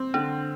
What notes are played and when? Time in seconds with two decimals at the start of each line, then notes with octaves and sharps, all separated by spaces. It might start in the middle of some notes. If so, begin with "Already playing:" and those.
Already playing: C4
0.14 D3 D4